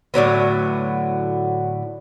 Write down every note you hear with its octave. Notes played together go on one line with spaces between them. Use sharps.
A2 D3 F#3 B3